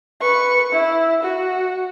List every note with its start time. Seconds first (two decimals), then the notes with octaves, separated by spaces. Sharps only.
0.21 B4 C#6
0.72 E4
1.23 F#4